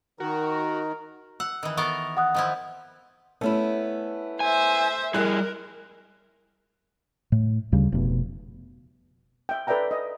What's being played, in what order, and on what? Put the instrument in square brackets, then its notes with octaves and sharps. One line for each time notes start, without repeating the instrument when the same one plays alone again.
[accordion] D#3 [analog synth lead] F#4 [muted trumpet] A#4
[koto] F#5 [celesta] E6
[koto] D#3 E3
[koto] B3 A4 A#4 [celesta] C#6
[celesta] F#5 D#6 F#6
[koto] D#3 F3 E4
[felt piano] A3 [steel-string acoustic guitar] B3 C#4 E4
[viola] C5 E5 [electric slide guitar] G#5
[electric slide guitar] G3 G#4 [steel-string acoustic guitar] E4 G#5 [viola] A#4 [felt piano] F#6
[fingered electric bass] A2
D2 C#3 G3
F1 B2
[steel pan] E5 G5
A4 B4 D5 E5 G5 A#5
D#5